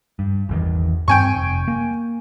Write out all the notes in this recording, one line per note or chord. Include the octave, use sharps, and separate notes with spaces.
G2
G#1 E2 D#3
G2 C4 G5 G#5 C#6
F1
A#3